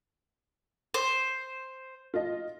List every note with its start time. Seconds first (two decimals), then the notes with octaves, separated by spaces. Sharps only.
0.94 C5
2.14 F4 D#5